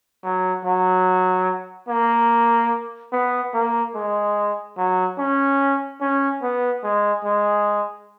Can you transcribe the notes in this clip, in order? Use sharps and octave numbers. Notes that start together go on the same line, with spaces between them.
F#3
F#3
A#3
B3
A#3
G#3
F#3
C#4
C#4
B3
G#3
G#3